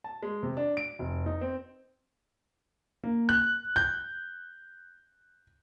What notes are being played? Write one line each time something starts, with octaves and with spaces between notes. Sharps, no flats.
A5
G#3
C3
D4
D7
F1
D#4
C4
A#3
F#6
G6